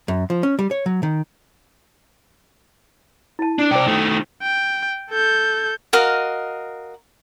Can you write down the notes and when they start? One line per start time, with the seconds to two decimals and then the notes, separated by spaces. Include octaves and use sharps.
0.08 F#2
0.30 F3
0.43 C#4
0.59 G3
0.71 C#5
0.86 F#3
1.03 D#3
3.39 E4 A5
3.59 D4
3.71 C3 C5 D5 G5
3.87 D#3 A3
4.42 G5
5.10 A4 G6
5.93 F#4 A#4 D#5 F5